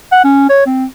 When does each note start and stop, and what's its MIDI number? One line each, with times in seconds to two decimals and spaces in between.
0.12 0.22 78
0.24 0.47 61
0.49 0.65 73
0.66 0.85 60